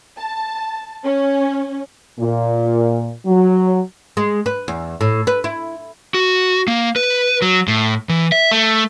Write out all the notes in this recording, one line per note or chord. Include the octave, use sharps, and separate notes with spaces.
A5
C#4
A#2
F#3
G#3
B4
E2
A2
B4
E4
F#4
A#3
B4
F#3
A2
E3
E5
A3